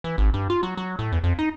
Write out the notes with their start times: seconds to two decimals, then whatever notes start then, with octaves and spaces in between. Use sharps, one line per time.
0.04 E3
0.18 G#1
0.34 G2
0.50 F4
0.63 F#3
0.77 F#3
0.99 A2
1.12 E2
1.24 F2
1.39 D#4